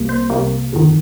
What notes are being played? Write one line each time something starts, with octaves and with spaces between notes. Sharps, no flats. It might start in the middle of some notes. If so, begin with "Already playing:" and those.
Already playing: C2 C3 G3 A#3
C5
C2 C3 G3 A#3
G1 F2 D#3